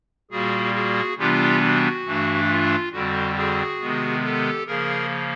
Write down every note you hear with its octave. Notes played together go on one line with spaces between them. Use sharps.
A#2 G3 A#3 F#4 G#4
F#4 G#4
C3 E3 G3 B3 D4 F4 G4
F#4
G2 E3 A3 D4
F4
F2 D3 G3 C4 F#4
F#4 G#4
C3 D#3 G#3 B3
G4 A4
C#3 F3 A#3 G#4 A#4